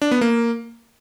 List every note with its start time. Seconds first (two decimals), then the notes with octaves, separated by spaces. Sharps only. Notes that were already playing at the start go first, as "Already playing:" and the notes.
0.02 D4
0.11 B3
0.21 A#3